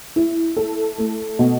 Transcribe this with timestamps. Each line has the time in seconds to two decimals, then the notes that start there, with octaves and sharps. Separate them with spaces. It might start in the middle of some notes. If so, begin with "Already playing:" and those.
0.16 E4
0.57 A4
0.98 A3
1.39 B2